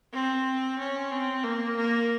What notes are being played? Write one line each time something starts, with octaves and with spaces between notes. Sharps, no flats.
C4
C#4
C4
A#3
A#3